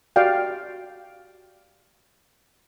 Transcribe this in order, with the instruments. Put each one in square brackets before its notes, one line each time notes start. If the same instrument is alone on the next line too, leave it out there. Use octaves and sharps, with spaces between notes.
[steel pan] F#4 G4 D5 F5 G5